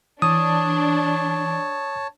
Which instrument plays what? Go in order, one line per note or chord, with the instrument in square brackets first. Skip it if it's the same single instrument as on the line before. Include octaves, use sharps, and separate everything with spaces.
[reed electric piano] E3 [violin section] D4 [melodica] C#5 A5 [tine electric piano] D#6